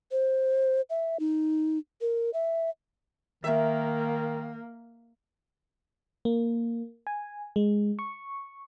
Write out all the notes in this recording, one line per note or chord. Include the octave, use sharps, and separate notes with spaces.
C5
E5
D#4
A#4
E5
D#3 A#3 E5
A#3
G#5
G#3
C#6